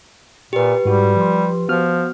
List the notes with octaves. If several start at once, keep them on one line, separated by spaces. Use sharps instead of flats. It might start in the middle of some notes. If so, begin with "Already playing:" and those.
A#2 G4 B4
G#2 G3 F#4
F3 C6
F3 B3 F#4 F6